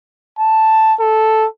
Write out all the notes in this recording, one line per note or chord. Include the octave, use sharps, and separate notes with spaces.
A5
A4